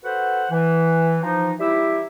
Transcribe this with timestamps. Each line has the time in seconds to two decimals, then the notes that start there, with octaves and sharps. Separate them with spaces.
0.04 F#4 A4 B4 C5 F#5
0.51 E3
1.22 F3 D#4
1.60 G3 E4 G4 E5